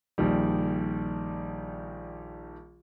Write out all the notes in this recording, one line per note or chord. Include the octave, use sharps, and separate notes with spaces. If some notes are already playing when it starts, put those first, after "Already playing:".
A#1 D#3 G3